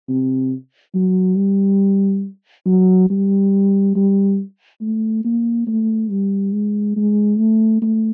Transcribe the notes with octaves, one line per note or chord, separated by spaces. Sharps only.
C3
F#3
G3
F#3
G3
G3
A3
A#3
A3
G3
G#3
G#3
A3
A3